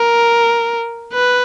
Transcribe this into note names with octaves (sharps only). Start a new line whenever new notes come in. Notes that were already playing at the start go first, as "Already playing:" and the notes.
Already playing: A#4
B4